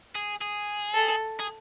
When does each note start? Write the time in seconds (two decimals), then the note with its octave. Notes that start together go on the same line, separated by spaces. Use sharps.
0.15 G#4
0.41 G#4
0.94 A4
1.40 G#4